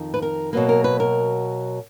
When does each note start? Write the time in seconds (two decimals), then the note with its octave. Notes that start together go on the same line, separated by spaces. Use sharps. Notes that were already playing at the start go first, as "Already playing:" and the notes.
Already playing: F2 D#3
0.14 B4
0.22 A#4
0.53 B2 F#3 A#3 B4
0.69 A#4
0.84 B4
1.00 A#4